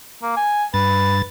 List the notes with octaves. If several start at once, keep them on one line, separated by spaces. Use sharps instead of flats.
A#3
G#5
G2 B4 A6